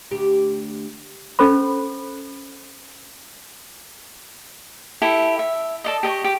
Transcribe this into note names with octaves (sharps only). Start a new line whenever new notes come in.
D2 G4
C#4 A4 C5 B5
E4 G4 A4 E5
E5
A4 D5 D#5
G4 D#5 A5 C#6
G4